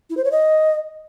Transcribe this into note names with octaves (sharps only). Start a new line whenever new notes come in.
E4
C5
C#5
D#5